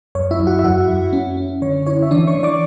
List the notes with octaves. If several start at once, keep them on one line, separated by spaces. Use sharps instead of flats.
F#2 C#5
E4 E5
F#2
F#4 F#5
E5
F#2 F#4 F#5
F#2
C#4
C#4
D3 C#5
E4 C#5
E5
E3 D4 D5
C#5 C#6
E3
D5 D6